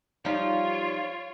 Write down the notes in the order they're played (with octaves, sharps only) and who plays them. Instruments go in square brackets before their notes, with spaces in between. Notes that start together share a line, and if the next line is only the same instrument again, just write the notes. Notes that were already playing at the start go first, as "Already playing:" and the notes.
[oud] F3 G3 D#4 [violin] F4 C#5